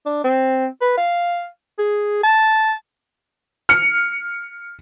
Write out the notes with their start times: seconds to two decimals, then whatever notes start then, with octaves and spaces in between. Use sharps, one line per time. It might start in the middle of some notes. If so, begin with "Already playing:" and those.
0.06 D4
0.24 C4
0.81 B4
0.97 F5
1.79 G#4
2.23 A5
3.69 F6 C#7